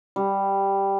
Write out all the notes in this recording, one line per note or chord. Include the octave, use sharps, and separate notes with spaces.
G3